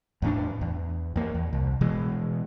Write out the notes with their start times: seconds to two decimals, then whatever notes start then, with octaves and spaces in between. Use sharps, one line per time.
0.22 E2 A2 D4
0.61 E2
1.16 E2 A#3
1.35 E2
1.53 C2
1.81 B2 E3 G#3